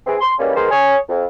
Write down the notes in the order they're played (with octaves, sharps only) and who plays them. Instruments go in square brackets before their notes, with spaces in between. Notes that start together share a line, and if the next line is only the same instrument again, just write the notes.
[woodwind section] E3 C4 G#4
C6
C#3 E3 G3 G#3 A#3 C#4
D#3 G#3 B3 G#4 A#4 C5
G#4 C#5
F2